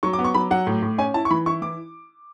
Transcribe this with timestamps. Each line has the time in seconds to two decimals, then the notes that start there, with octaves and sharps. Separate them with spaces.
0.03 F#3 C#6
0.13 D6
0.19 B3
0.24 C#6
0.34 F#3 B5
0.51 F#3 F#5
0.67 A2
0.82 A2
0.98 C#4 G#5
1.14 E4 A5
1.25 C#6
1.30 E3 B5
1.46 E4 C#6
1.62 E3 D6